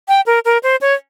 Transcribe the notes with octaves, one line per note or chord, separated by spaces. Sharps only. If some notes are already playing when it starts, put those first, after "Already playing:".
G5
A#4
A#4
C5
C#5